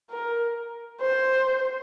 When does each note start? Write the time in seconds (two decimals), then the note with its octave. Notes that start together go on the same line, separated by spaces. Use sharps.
0.10 A#4
1.01 C5